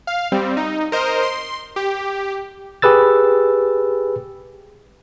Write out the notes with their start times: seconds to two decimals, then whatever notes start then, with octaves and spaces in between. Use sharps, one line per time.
0.07 F5
0.32 G3 C4
0.57 D#4
0.92 A#4 C5 D#5
1.23 C6
1.76 G4
2.82 G4 G#4 B4 E6 A6